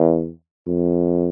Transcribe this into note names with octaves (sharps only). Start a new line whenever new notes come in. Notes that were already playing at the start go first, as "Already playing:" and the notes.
Already playing: E2
F2